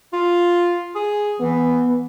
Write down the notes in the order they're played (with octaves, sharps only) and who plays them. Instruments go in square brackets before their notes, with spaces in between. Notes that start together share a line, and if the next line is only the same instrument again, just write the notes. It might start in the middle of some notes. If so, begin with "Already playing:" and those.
[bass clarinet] F4
G#4
[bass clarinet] E3 [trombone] B3